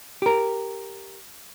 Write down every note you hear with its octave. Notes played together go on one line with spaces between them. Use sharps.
G4 A#4